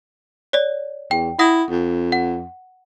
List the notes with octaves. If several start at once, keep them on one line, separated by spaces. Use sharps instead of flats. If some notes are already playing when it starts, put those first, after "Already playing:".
C#5 D5
E2 G5
E4 F#5 D#6 A#6
F2
F#5